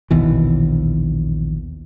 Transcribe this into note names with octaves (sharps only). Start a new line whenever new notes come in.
A#1 D#2 B2 E3